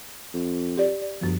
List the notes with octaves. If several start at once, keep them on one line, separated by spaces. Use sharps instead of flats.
F2
G4 D5
D5
G1 F#2 F3